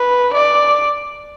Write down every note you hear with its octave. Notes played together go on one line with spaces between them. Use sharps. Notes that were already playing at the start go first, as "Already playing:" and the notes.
Already playing: B4
D5